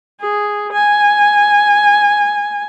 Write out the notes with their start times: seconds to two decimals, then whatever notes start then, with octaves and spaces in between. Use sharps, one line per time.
0.21 G#4
0.73 G#5